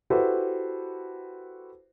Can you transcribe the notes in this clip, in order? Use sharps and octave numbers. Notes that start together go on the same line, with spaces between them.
E4 F#4 G4 A4 B4 C5